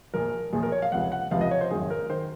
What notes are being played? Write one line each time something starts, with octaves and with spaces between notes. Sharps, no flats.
A#1 A#2 F3 A#4
A#1 A#2 F3 G#4
A#4
C#5
F5
C#2 C3 F3 F#5
F#5
C#2 C3 F3 F5
D#5
C#5
C5
G#1 F#2 D#3 G#4
A#4
D#3 C5